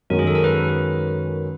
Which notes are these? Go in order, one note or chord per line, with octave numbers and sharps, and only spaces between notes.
F#2 D#3 G#3 C#4 F#4 A#4
G#4
A4
A#4
B4